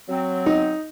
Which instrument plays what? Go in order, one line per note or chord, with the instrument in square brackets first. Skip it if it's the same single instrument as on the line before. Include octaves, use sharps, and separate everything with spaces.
[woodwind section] F#3 C4
[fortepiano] D#4